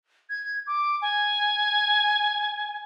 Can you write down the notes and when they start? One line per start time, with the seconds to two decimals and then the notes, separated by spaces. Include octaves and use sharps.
0.30 G#6
0.67 D6
1.02 G#5